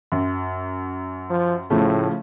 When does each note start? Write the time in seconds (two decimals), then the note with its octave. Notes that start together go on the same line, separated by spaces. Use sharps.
0.12 F#2
1.30 F3
1.70 A2 C#3 F3 A3